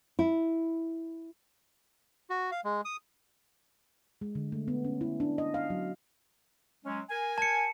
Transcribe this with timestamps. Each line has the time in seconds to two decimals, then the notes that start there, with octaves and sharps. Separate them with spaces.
0.19 E4
2.30 F#4
2.51 F5
2.64 G#3
2.85 D#6
4.21 G#3
4.35 D3
4.52 A3
4.68 B3
4.84 C#4
5.01 E4
5.20 D4
5.38 D#5
5.54 F5
5.70 F#3
6.85 F#3 G#3 C#4
7.09 A#4 G#5
7.38 A5 C#7